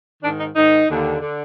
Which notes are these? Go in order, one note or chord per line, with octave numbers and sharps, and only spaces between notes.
G#2 D#3 D4
D#4
G#2 D#3 D#4
D#2 D3
D3